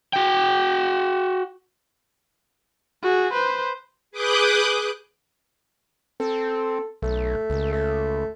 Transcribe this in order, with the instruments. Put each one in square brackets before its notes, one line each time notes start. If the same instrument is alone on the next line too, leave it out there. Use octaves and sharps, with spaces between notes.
[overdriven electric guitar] F#4 G5
[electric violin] F#4 G#4
B4 C5
[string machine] G#4 B4 D6 D#6 F#6 G6
[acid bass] C4 [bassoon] A4
[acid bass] B1 [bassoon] A3
[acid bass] C#2
[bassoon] A3